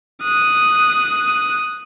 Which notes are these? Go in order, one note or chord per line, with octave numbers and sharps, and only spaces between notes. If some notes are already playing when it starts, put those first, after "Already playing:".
D#6 F#6